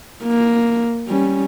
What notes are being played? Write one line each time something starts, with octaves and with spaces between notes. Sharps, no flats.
A#3
G3 C#4